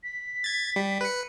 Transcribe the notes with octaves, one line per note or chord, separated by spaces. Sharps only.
B6
G#6 A6
G3
B4 C#7